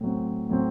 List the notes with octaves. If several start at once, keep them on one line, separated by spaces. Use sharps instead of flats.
A2 F#3 C4
A2 F#3 C4